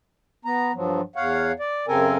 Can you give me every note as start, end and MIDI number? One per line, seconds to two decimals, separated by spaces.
0.45 0.72 59
0.45 0.72 82
0.75 1.01 43
0.75 1.01 53
0.75 1.01 54
1.16 1.52 40
1.16 1.52 73
1.16 1.52 77
1.16 1.52 78
1.59 1.86 74
1.88 2.18 42
1.88 2.18 49
1.88 2.18 60
1.88 2.18 69
1.88 2.18 70
1.88 2.18 80